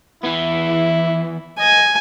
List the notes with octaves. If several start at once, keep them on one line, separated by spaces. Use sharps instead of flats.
E3 B3 E4
D#5 G#5